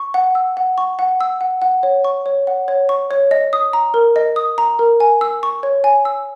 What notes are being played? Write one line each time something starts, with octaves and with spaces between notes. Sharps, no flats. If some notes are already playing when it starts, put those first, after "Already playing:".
Already playing: C#6
F#5
E6
F#5
C#6
F#5
E6
F#5
F#5
C#5
C#6
C#5
F#5
C#5
C#6
C#5
D#5
D#6
A#5
A#4
D#5
D#6
A#5
A#4
G#5
E6
C#6
C#5
G#5
E6